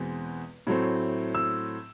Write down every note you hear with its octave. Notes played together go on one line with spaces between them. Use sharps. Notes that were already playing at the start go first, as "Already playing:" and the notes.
Already playing: E2 B2 G#3 C4
A2 F#3 A3 C4
E6